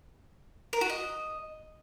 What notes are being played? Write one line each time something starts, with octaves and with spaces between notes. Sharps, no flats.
A#4
F#4
D#5